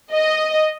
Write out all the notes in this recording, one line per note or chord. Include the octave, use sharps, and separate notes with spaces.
D#5